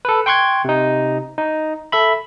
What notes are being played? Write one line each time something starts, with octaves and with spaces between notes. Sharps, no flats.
A4 B4
G5 C6 C#6 F#6 G#6
C3 D#4
D#4
A4 E5 B5